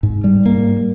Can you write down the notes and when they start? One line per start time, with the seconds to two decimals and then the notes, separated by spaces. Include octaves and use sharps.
0.03 G#2
0.24 G3
0.46 A#3